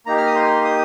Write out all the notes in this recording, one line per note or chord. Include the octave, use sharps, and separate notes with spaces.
A#3 D#4 G4 A#5
F6
D#6
C6
D#6